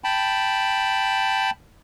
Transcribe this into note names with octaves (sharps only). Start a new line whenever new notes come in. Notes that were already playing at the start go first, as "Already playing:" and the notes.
G5 A5 B5